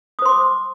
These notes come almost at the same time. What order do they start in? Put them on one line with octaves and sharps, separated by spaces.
D#6 C5 C6 D6